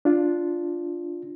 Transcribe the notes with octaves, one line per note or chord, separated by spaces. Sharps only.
D4 F4